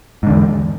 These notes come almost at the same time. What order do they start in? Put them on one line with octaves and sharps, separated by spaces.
G#2 D3 E2